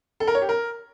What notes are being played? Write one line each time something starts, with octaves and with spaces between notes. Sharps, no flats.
A4
A#4
C#5
G4
A#4